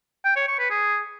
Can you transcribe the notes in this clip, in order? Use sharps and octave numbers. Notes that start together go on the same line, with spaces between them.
G5
C#5
C#6
B4
G#4